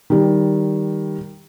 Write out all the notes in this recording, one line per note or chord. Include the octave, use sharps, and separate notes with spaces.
D#3 G3